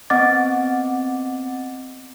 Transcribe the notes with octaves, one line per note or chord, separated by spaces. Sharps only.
B3 C4 D#5 F#5 D6 A6